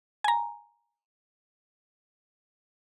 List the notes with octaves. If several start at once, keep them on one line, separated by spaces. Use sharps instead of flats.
G#5 A#5